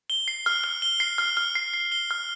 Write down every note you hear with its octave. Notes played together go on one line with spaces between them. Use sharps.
G7
C7
F6
F6
G7
C7
F6
F6
C7
C7
G7
F6